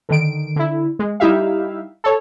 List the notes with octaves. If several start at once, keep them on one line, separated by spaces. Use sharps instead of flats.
D3 D#3 D7
D3 E4
G#3
G3 D#4 E4 G4 E5 F5
A4 C#5